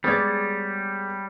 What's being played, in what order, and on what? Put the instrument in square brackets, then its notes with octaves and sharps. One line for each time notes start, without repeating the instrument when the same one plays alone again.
[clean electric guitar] G3 [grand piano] G#3 B3 [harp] G#4 C#5 D5